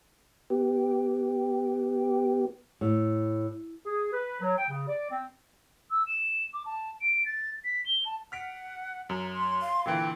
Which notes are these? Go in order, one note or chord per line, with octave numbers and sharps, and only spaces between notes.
B3 G4
A2
G#4
B4
F#3
G5
C#3
D5
C4
E6
E7
D6
A5
D7
A6
B6
G7
A5
F#5 F6 B6 D7
F#2 A#5
C6
F5
A#2 D3 E3 G5